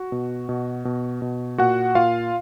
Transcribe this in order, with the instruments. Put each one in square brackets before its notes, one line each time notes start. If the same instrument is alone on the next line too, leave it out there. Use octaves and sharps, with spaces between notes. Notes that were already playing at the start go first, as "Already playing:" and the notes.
Already playing: [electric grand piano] F#4
B2
B2
B2
B2
A#2 F#4 F#5
A#2 F4 F5